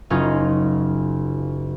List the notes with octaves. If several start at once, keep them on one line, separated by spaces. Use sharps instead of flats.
F#1 C#4 D#4 F4